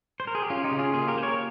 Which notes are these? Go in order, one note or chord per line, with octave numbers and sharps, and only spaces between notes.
C5
A#4
G#4
G4
C#4 F4
D#4 G4
C#3
F4 G#4
A#3 F4 G#4
G4 A#4
A#3 C5
A#4 C#5